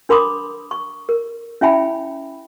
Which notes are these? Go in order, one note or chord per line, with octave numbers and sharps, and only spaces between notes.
D4 A#4 B5 C6 D6 D#6
C#6
A#4
C#4 E4 E5 G5 G#5 B5